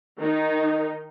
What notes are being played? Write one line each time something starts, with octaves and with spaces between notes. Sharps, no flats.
D#3 D#4